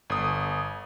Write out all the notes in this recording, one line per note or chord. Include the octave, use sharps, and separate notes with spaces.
G1 D#6